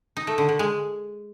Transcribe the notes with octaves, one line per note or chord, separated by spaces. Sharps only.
D#4
A3
D3
D3
G#3